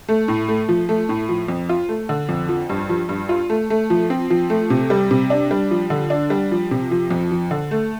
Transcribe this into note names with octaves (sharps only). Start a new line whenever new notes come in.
A3
A2
A3
F3
A3
A2
F3
F2
F4
A3
D3
F2
F3
G2
F3
G2
F4
A3
A3
F3
C4
F3
A3
C3
G3
C3
D4
G3
F3
D3
D4
G3
F3
C3
F3
F2
F3
D3
A3